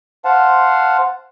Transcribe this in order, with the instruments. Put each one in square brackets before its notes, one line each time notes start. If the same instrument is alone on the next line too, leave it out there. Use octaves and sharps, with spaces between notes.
[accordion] C5 F5 F#5 A5